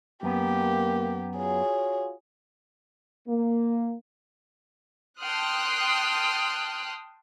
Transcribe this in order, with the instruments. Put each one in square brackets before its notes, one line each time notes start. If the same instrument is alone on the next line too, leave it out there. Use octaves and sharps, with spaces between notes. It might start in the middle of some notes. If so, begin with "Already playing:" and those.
[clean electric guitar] F#2 B3 [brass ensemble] A#3 [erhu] G4
[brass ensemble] F4 F#4 C#5 [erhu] G#4
[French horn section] A#3
[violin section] G5 A5 C6 D#6 F6 F#6